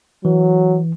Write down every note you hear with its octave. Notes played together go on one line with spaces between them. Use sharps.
E3 F#3